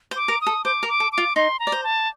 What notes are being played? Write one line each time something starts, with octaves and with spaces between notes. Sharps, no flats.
C5
D6
A#4
D#6
A4
C5 D6
A#4
D6
A4
D6
F4
D#4 C6
A#5
D5
C5
A5